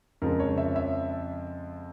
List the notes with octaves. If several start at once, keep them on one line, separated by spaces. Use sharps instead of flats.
F2 C#3 F3 G#3 A#4
C#5
E5
E5